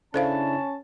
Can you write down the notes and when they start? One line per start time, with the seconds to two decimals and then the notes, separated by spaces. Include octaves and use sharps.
0.14 C#3 C#4 D4 E4 A4 C5 F5 A5